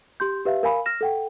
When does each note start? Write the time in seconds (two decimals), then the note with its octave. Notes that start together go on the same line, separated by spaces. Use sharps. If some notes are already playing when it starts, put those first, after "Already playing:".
0.20 G4 C6 G6
0.45 G4 B4 E5 F5
0.63 A#4 F5 G#5 B5
0.86 F6 A#6 E7
1.01 A4 F#5 G5